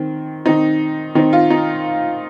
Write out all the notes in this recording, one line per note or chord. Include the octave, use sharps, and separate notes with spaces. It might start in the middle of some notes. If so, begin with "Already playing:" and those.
Already playing: D#3 C4
D#3 C4 D#4
D#3 C4 D#4
F4
D#4